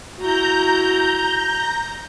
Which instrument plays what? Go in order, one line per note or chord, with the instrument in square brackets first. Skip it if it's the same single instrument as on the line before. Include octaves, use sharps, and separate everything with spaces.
[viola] E4 F#4 [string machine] A#5 G6